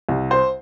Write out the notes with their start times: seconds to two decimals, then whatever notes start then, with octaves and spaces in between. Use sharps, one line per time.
0.09 C2
0.31 C5